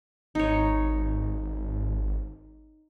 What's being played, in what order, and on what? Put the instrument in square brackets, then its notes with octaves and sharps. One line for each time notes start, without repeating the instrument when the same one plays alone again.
[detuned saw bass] G#1 [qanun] D#4 C#5